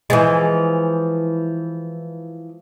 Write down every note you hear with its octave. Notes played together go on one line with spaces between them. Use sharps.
E3 F3 G#3